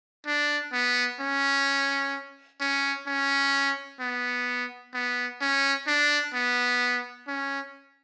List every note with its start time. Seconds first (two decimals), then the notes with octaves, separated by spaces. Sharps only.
0.26 D4
0.73 B3
1.20 C#4
2.60 C#4
3.07 C#4
4.00 B3
4.94 B3
5.41 C#4
5.87 D4
6.34 B3
7.27 C#4